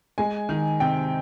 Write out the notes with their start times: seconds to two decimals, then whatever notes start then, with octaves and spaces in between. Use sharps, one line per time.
0.18 G#3 G#5
0.49 D#3
0.80 C3 G5